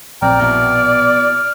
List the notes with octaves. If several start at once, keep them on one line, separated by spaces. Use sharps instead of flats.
A#1 C4 D5 G5 A#5 F6
B2 B3 E4 F6